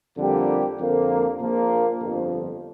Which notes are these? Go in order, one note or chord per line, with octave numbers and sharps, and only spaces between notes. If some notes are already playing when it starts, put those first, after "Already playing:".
F2 D3 G3 A#3 G4
F2 D3 F3 A#3
A#1 A#2 F3 A#3
G1 F2 F3